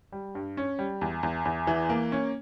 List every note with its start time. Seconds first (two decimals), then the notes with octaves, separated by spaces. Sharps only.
0.12 G3
0.35 G2
0.57 C#4
0.79 G3
1.01 E2
1.23 E2
1.45 E2
1.67 E3
1.89 A#3
2.12 C#4